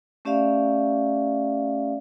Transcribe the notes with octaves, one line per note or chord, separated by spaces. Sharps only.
A3 C#4 G4 D5 E5 F5